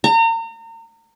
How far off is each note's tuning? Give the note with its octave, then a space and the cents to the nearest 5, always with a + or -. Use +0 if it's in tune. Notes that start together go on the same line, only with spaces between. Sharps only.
A#5 -35